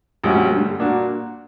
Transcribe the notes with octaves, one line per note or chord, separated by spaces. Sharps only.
A#1 A#2 G3 C#4 F#4
G2 D3 G3
A#2 A#3 D4 F#4